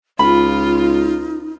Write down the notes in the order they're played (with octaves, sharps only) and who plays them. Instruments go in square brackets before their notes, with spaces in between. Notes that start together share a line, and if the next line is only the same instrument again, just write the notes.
[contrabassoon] C#2 [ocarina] D#4 [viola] F4 [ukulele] B5